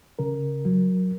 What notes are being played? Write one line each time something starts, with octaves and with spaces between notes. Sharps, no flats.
C#3 A#4
F#3